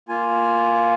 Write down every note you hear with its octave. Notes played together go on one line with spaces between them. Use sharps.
A#3 F4 G#5